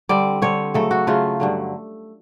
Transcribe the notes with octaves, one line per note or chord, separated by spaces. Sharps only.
D3 G3 C4 D5
D3 G3 C4 C#5
C#3 F#3 A3 A4
F#4
C#3 F#3 A3 F4
G2 D3 F#3